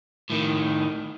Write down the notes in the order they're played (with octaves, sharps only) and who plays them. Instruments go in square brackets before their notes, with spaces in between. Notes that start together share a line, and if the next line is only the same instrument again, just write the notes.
[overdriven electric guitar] A2 D#3